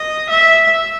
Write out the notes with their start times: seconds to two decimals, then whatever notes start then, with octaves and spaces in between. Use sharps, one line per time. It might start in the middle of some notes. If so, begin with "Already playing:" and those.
Already playing: D#5
0.30 E5